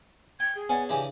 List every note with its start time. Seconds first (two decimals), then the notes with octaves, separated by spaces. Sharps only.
0.40 G5 G#6
0.56 G#4
0.69 B3 C#4 D5 F#5 G#5
0.89 C#3 E3 D4 G4 D#5 G#5